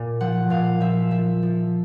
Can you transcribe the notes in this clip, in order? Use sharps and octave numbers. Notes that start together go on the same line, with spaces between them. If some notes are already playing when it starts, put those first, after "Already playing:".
Already playing: A#2
F3 F#5
A#2 F5
F3 E5
F3 E5
F3